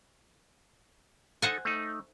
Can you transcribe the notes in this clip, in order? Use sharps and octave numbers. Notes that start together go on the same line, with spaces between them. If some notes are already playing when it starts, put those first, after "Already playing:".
D#4 A4 C5 F#5 G#5
A3 D#4